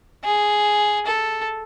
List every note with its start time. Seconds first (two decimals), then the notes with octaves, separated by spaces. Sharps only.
0.24 G#4
1.06 A4